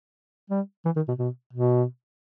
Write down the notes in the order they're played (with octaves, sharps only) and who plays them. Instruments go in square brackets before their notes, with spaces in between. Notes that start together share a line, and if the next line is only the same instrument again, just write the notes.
[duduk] G3
E3
D#3
B2
B2
B2